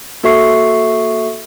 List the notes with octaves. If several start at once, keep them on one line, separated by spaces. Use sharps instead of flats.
A#3 F#4 A4 E5 C#6 C7